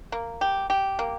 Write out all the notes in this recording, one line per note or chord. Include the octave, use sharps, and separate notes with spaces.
A#3
G4
G4
A#3